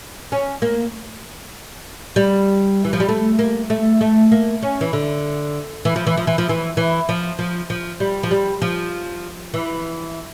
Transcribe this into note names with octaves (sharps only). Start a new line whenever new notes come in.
C#4
A#3
G3
E3
F3
G3
A3
A#3
A3
A3
A#3
C#4
E3
D3
E3
F3
E3
F3
E3
F3
E3
E3
F3
F3
F3
G3
F3
G3
F3
E3